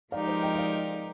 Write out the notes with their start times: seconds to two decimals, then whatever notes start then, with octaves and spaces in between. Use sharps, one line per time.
0.12 F3 G#3 D#4 G4 A#4 D5 F5
0.28 C5 D#5
0.43 D#5 G5
0.53 D#5
0.58 D5 F5